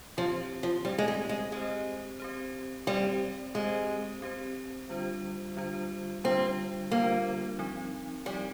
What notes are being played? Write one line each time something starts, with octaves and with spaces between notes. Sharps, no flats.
F3 C4 G4 C5
F3
G3 C4 G4 C5
G#3
G3
G#3
G#3 C4 G4 C5
C4 G4 C5
G3 C4 G4 C5
G#3 C4 G4 C5
C4 G4 C5
D3 G3 D4 F4 C5
D3 G3 D4 F4 C5
D3 G3 C4 D4 F4 C5
D3 G3 A#3 D4 F4 C5
F3 C4 D#4
F3 G3 C4 D#4